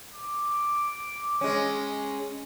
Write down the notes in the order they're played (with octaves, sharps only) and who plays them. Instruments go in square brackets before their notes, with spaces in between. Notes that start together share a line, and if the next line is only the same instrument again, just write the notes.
[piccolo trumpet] D6
[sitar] G#3 C#4